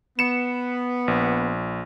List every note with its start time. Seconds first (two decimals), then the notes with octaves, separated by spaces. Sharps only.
0.19 B3 C#7 E7
1.08 A#1